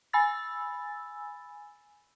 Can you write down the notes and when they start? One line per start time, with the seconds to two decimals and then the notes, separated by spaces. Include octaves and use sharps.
0.13 G#5 B5 E6 A6